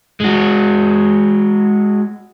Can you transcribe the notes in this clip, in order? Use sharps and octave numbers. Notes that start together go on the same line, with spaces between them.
G#3 F#4